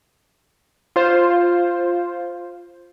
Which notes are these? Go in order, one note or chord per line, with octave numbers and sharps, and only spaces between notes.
F4 C5